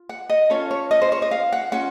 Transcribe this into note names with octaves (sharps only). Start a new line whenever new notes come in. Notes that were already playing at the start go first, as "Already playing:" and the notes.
Already playing: F4
F#5
D#5
C#4 F4 A4 C#5
C#5
D#5
C5
C#5
D#5
F5
F#5
C#4 F4 F#5